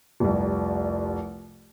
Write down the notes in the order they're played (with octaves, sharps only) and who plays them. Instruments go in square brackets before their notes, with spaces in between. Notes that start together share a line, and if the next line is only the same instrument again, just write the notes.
[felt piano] F1 C2